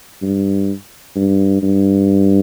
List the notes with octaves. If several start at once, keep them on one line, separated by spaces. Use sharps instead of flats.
G2
G2
G2